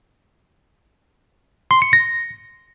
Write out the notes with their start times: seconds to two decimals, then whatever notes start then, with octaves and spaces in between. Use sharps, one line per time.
1.71 C6
1.82 C#7
1.93 A#6